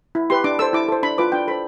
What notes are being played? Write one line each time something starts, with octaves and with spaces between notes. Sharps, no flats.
E4
G4 B4 C6
D4 D6
A4 C5 E6
E4 D6
A4 C5
D4 B5
F4 B4 D6
D4 G5
A4 C5 B5